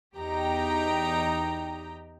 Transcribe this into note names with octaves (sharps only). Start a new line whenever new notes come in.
E2 D#4 G4 G5 A#5